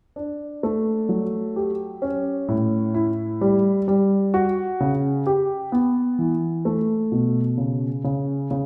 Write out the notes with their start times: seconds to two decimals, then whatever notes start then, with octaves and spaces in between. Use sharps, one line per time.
0.16 D4
0.63 A3
1.09 F#3
1.56 G4
2.02 C#4
2.48 A2
2.94 E4
3.41 G3
3.88 G3
4.34 F#4
4.80 C#3
5.27 G4
5.72 B3
6.19 E3
6.65 A3
7.12 B2
7.58 C#3
8.04 C#3
8.51 C#3